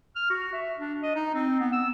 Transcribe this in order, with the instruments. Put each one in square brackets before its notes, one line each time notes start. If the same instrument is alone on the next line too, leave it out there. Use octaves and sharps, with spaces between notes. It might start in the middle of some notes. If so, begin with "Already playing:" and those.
[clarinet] F6
F#4
E5
D4
D#5
D#4
C4
B3
E6